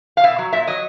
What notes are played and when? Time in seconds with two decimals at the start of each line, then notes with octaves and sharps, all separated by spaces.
0.17 F5
0.23 B2 E5
0.38 F#3
0.53 A#2 E5
0.67 F#3 D#5